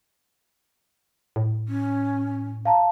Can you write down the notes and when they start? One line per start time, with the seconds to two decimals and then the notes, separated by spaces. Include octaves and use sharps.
1.36 A2
1.68 C#4
2.65 F5 A5 A#5